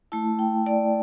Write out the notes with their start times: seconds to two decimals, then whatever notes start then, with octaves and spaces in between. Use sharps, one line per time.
0.12 A3 E4 A5
0.39 G5
0.66 D5